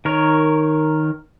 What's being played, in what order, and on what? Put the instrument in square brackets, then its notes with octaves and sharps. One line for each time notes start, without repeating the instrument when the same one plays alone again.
[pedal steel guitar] D#3 A#4 C#5